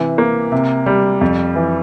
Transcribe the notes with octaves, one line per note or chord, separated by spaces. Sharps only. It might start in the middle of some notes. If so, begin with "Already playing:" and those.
Already playing: C3 E3
A#3
C3
G3
F2
E3